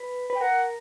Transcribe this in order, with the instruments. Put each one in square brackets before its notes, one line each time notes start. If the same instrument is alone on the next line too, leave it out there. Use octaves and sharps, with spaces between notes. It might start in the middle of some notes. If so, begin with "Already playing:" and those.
Already playing: [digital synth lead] B4
B4
[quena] G5
[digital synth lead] A#4 [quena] F#5